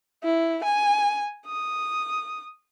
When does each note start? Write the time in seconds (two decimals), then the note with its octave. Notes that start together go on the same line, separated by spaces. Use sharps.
0.24 E4
0.64 G#5
1.46 D#6